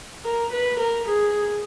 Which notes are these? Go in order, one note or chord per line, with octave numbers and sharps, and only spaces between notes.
A#4
B4
A#4
G#4